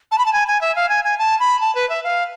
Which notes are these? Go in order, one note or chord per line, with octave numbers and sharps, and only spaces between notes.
A5
B5
A5
G#5
G#5
E5
F5
G#5
G#5
A5
B5
A5
B4
E5
F5